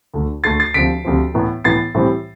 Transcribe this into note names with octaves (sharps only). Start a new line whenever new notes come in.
D2 D3 A3
D2 D3 A3 A6 C7
A6 C7
D2 C3 F3 B6 D7
D2 C3 F3
A2 E3 B3 E4
A2 E3 B3 E4 A6 C7
A2 E3 G3 C4